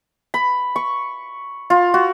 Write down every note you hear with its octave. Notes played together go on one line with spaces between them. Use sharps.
B5
C#6
F4
F#4